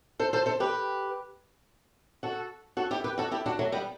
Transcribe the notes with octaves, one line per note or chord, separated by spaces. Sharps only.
A4 C5
A4 C5
A4 C5
G4 B4
F#4 A4
F#4 A4
E4 G4
G4 B4
F#4 A4
E4 G4
D4 F#4
F#3 A3
G3 B3